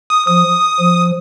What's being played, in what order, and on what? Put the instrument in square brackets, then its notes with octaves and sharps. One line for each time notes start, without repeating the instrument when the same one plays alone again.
[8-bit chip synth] D#6
[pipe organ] F3 [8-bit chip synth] D#6
[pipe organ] F3